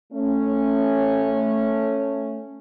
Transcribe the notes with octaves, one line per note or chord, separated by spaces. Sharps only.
A3 C#4